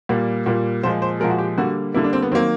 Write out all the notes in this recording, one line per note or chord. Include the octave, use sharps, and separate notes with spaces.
A#2 G3 A#3
A#2 G3 A#3
A#2 F3 G#3 C5
C5
A#2 F3 G#3 A#4
F#4
G4
D3 G3 A#3 F#4
D3 G3 A#3 E4
D4
C4
B3
D#3 F#3 A#3 C4